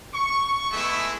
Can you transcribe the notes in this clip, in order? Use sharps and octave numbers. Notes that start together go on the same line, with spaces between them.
C#6
G#3 A3 B3 E4 G#4 E5